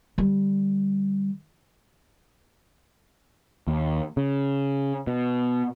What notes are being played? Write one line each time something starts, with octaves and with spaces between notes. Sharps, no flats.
D3 G3
D#2
C#3
B2